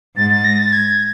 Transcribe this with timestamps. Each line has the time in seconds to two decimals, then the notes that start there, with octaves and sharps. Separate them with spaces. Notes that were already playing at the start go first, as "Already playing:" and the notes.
0.16 G#2 A6
0.30 A6
0.44 A#6
0.59 A6
0.73 G#6